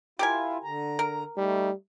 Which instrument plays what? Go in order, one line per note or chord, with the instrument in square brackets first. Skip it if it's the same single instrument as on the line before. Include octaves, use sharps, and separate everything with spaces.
[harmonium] E4 F4 [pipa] G4 A#4 G#5
[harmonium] D3 A#5
[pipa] A#4
[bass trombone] G3 [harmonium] A3 D#4